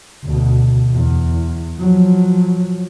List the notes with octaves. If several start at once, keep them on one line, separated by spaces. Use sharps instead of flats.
D2 B2
E2
F3 F#3